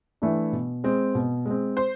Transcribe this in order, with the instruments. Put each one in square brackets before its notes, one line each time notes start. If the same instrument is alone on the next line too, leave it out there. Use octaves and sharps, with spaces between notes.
[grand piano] E3 A3 D4
B2
G#3 C4
B2
G#3 C4
C5